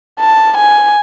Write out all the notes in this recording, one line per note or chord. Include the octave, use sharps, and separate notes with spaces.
A5
G#5